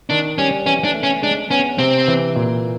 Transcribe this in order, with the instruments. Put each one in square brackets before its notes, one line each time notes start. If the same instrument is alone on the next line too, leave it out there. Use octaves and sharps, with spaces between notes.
[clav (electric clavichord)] D#3 [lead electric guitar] D4
[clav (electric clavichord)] G3 [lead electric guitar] C#4
[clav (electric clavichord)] E3 [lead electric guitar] C#4
[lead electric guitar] D4
[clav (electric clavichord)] A3
[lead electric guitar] C#4
[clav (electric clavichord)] G#3 [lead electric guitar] D4
[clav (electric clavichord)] B3 [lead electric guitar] C#4
[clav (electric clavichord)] C3 [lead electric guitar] C4
[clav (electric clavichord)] E3
A#2